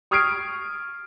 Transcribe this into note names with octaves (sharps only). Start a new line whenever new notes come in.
C#6 D#6 F6 G#6 C7 D7